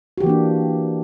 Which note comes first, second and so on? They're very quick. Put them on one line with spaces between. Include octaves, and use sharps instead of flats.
F#4 G4 E3 A#3 D4